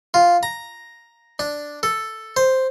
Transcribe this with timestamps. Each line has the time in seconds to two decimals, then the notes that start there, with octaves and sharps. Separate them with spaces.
0.14 F4
0.43 A#5
1.39 D4
1.83 A4
2.37 C5